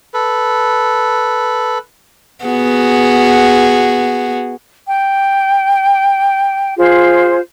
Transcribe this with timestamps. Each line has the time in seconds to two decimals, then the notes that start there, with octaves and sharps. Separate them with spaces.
0.14 A4 B4
2.45 B3 F#4 G#4
4.87 G5
6.77 F4 G#4 C5